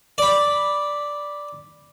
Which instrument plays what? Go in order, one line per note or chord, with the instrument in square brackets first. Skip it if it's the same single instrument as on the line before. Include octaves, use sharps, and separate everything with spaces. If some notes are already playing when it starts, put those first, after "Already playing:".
[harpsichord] D5 B5